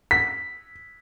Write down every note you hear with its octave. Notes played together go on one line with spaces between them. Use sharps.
B6